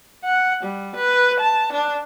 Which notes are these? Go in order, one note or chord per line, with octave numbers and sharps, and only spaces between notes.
F#5
G3
B4
A5
D4